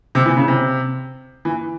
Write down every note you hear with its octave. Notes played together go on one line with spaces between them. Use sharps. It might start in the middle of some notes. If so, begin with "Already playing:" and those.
C3
E3
C#3
C3
E3